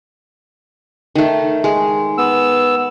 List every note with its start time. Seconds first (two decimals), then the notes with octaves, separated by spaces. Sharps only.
1.15 D#3 A3
1.64 G#3
2.18 B3 E6